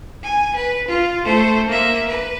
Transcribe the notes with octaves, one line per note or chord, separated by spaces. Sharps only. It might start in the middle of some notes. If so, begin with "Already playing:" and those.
G#5
B4
F4
A3 C5
A#3 E5
B4